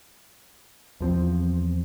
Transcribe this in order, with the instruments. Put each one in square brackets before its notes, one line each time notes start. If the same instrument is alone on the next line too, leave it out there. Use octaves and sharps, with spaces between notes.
[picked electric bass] E2 F3 C4